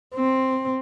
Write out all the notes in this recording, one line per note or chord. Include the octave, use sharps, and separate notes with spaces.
C4